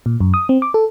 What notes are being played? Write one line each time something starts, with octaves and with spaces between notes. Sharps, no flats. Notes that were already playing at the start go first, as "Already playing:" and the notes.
A#2
F#2
D#6
C4
D6
A4